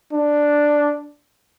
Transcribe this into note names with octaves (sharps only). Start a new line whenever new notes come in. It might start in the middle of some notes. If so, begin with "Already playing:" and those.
D4